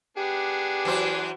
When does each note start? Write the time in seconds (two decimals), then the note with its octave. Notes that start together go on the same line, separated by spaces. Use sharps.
0.17 B3 D4 G4 G#4
0.85 E3 F#3 C5